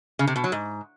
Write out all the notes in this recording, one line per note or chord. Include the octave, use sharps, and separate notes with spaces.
C#3
C3
B2
F#3
G#2